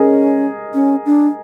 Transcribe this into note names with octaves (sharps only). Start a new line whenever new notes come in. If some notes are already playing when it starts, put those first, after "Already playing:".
Already playing: C#4 G#4 A#4 D#5
C#4
D4